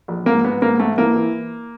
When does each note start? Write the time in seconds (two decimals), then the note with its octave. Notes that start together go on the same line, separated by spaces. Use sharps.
0.08 A#1
0.26 G#2 A#3
0.44 G#2 B3
0.61 G#2 A#3
0.79 G#2 A3
0.98 E3 A#3
1.16 E3